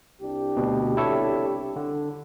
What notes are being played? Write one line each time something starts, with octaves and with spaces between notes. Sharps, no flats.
C2 D4 G4
D2 B2
E4 A4 C#5
D3